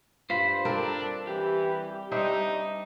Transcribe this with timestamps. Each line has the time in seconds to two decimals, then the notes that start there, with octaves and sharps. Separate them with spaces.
0.30 G2 F4 C5 B5
0.65 C4 D4 A4 A#4
1.27 E3 G3 G4
2.12 D4 D#4 C5 E5